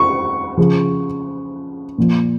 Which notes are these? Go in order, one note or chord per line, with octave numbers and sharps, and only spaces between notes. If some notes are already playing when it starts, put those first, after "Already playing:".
Already playing: C#6
C#3 F3
A#2 F3